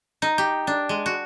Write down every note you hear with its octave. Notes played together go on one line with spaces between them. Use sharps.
D#4
G4
D4
G#3
F#4